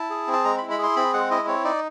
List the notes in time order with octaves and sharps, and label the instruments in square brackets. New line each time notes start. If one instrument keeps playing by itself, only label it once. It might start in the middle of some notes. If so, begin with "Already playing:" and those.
Already playing: [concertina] E4 A5
G#4
C4
A5
G#3 A#5
B5
E4
B5
G#4 C6
C4 B5
G#3 F#5
E4 D#5
C4 C#5
D#4 D5